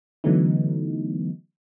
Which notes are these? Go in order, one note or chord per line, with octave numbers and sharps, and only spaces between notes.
D3 E3 F#3 A3 B3 D#4